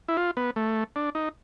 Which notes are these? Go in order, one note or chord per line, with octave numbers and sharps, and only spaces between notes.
E4
F4
B3
A3
D4
D#4